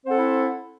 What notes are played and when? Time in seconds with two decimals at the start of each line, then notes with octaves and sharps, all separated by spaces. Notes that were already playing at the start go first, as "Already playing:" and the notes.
0.03 C4
0.06 C5
0.09 F#5
0.11 A4
0.14 E4